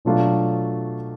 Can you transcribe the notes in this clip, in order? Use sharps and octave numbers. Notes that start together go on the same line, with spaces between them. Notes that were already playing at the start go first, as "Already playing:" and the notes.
B2 F#3 A3 D4 F4